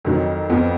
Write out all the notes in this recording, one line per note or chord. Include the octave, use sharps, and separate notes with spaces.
F2 D#3 F#3
F2 F3 B3 F4